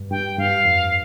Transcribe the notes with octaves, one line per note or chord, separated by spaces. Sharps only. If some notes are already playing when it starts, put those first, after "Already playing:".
Already playing: G2
G2 G5
G2 F5
F2